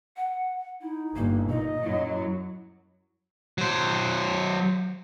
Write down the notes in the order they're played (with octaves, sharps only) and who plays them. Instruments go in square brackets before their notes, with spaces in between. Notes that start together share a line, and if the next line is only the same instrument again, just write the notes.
[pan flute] F#5
[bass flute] D#4 [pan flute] E4
[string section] G1 [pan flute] A#3
[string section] A#2 [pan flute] D#4 [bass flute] D#5
[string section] F#2 F#3 [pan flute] E4
[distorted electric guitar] F#3 C5